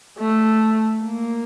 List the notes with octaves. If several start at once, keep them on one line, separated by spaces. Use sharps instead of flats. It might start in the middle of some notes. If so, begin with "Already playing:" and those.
A3
A#3